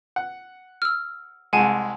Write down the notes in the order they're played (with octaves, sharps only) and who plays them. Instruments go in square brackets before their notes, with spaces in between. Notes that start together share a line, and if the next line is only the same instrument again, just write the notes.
[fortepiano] F#5
[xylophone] E6 F6
[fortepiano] C2 G#3 [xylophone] F#5 G#5 A5